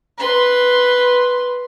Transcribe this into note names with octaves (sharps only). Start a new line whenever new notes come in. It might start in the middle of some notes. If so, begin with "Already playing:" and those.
B4 C6